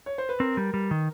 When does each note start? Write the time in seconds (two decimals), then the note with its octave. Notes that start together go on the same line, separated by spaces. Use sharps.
0.06 C#5
0.18 C5
0.29 B4
0.40 C4 A#4
0.57 G3
0.74 G3
0.91 D#3